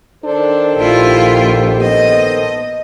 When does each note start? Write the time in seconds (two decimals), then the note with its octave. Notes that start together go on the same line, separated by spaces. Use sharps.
0.24 D#3 D4 A4 C5
0.77 A#1 E4 F4 G4
1.81 B3 D#5